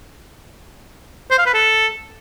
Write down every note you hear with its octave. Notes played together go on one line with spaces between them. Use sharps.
C5
F5
B4
A4